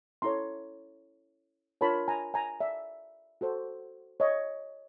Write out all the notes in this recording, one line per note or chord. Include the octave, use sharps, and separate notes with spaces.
C#4 E4 A4 C#5 A#5 C6
D4 F4 A#4 C#5 A5 B5
G#5 A#5
G#5 A#5
D5 E5
F#4 A4 C5
C#5 D#5